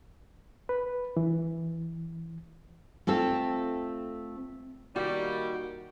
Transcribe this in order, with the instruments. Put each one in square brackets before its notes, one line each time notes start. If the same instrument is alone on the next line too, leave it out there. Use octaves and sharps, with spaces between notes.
[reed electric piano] B4
E3
[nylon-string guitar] A3 C4 F4 A4
[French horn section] D#3 A#3 [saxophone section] G3 [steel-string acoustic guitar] F#4